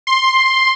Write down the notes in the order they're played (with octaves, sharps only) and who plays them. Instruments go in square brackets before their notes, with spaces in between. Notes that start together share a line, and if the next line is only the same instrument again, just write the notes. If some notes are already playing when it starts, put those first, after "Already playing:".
[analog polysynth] C6